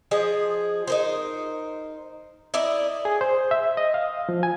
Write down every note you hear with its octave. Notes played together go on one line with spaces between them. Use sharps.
F3 G#4 D#5
D#4 A#4 C5
E4 A#4 D5 D#5
G#4
C5
E5
D#5
F5
F3
G#5